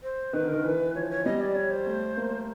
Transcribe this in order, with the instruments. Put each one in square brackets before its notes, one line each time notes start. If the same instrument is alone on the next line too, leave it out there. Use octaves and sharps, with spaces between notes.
[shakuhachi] C5
[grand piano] D#3 [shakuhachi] B4
[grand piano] D3 [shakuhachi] A#4
[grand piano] D#3
[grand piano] E3 [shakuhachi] B4
[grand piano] F3 [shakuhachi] C#5
[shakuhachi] C5
C#5
[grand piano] G3 [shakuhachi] D#5
[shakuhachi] D5
C#5
C5
[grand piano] A3
A#3